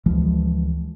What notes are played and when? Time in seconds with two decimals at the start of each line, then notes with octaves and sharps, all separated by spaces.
0.06 D2 E3 F3 G#3